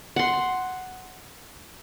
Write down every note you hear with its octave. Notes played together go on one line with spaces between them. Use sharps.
F#5 C6